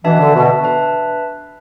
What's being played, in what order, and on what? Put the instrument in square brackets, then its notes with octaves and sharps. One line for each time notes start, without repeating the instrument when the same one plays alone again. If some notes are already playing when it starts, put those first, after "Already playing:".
[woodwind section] B2 E3 [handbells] D4 B4 E5 A5
[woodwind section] D3
B2
[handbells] D4 B4 E5 A5